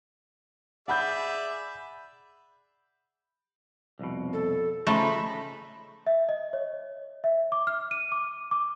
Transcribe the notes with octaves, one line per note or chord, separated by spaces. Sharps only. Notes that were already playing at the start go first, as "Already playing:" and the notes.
G#4 D5 E5 F#5 B5 G6
C2 F2 B2
A4
C#3 F3 A3 D#4 B5
E5
D#5
C#5
E5
D6
F6
D#7
D6
D6